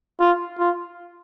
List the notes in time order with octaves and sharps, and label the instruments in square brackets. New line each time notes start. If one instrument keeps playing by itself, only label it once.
[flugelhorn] F4
F4